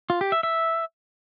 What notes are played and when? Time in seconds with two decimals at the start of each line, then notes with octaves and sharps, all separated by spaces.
0.10 F4
0.21 G4
0.32 E5
0.43 E5